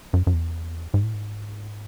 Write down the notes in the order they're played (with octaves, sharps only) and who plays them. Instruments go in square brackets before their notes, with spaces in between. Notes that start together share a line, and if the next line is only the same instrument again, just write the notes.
[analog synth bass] F#2
F#2
E2
G#2
A2
G#2